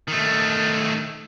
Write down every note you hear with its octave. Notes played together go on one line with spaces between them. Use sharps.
D#3 A3